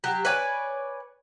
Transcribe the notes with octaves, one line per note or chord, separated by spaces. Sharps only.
F#3 G4
B4 C#5 D5 G#5